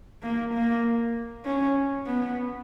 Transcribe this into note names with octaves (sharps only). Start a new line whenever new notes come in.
A#3
A#3
C#4
B3